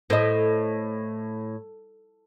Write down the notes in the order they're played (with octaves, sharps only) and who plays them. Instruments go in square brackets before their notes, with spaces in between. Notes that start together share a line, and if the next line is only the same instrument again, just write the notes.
[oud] A2 [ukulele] C5 D#5